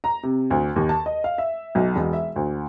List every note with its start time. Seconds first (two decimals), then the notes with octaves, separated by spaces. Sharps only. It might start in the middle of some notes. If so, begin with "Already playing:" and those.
0.04 A#5
0.23 C3
0.50 D2
0.76 D#2
0.89 A5
1.06 D#5
1.24 F5
1.38 E5
1.75 B1
1.96 E1
2.13 E5
2.36 D2